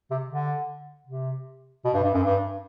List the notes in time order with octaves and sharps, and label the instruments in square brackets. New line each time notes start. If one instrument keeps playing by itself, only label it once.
[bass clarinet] C3
D3
C3
B2
G2
G2
F#2
G2